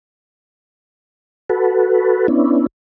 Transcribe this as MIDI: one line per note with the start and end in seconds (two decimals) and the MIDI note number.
1.50 2.27 66
1.50 2.27 69
1.50 2.27 71
2.28 2.66 59
2.28 2.66 61
2.28 2.66 62
2.28 2.66 64